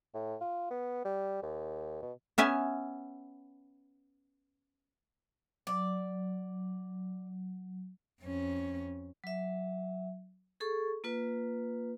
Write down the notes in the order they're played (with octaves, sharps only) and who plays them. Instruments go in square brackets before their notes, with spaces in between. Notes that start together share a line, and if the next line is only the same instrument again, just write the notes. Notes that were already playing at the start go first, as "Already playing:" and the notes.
[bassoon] A2
F4
B3
G3
D#2
B2
[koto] B3 C#4 E5 G#5
[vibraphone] F#3 [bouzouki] D5
[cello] F2 C#4
[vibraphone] F#3 E5
G#4 A4 C#6
A#3 F4 B4